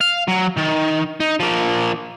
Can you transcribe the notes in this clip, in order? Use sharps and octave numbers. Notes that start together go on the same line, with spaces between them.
F5
F#3
D#3
D#4
F3 A#3